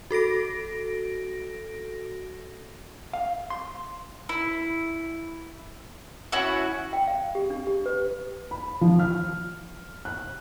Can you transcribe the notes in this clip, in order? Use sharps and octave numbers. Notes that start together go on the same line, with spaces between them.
F#4 A4 A#6 D7
F5
C6
E4
C#4 E4 F#4
G5
F5
G4
D4
G4
B4
B5
F3
F6
F#6